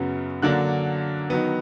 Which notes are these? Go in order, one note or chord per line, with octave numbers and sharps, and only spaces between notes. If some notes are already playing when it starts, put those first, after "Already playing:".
Already playing: F#2 C#3 F#3 B3
D3 F#3 A#3 D4 F#6
D#3 F#3 B3